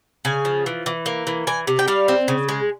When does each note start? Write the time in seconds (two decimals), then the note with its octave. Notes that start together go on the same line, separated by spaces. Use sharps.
0.25 C#3 G#5
0.45 F3
0.66 E3
0.86 E3
1.06 A#3
1.27 E3
1.47 E3 G#5
1.67 C3
1.79 G5
1.88 G3 F5
2.08 C4
2.28 C#3
2.49 G#3